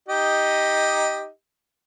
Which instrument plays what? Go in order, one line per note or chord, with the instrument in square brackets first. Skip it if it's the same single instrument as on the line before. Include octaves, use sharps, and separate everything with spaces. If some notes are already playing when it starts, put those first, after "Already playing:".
[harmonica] D#4 G4 D#5